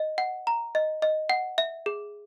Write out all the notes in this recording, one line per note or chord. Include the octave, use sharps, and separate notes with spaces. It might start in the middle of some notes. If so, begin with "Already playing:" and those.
Already playing: D#5
F#5
A#5
D#5
D#5
F#5
E5
G#4